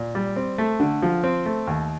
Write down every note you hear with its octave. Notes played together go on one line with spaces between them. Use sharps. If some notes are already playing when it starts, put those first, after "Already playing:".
Already playing: A#2
G3
C4
A3
D3
F3
C4
A3
D#2